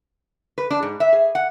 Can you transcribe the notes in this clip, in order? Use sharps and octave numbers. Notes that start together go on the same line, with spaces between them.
B4
D4
G#2
E5
G#4
F#5